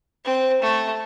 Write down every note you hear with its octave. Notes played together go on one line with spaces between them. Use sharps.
C4
A3